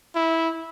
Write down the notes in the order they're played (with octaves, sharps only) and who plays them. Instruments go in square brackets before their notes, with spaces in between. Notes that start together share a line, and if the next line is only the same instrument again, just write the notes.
[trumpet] E4